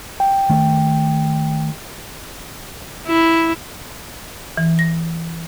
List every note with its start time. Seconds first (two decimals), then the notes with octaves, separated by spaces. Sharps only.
0.20 G5
0.50 D#3 A3
3.07 E4
4.57 E3
4.79 A#6